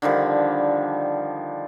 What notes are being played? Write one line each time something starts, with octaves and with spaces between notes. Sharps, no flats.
D3 D#3 F3 G3